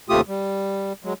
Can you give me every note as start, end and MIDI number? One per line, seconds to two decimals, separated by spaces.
0.10 0.21 39
0.10 0.21 48
0.10 0.21 57
0.10 0.21 65
0.10 0.21 67
0.10 0.21 87
0.28 0.93 55
1.04 1.13 54
1.04 1.13 56